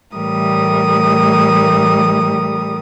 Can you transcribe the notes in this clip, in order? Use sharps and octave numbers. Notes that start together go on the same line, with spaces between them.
A2 E3 G3 A3 A#4 D#6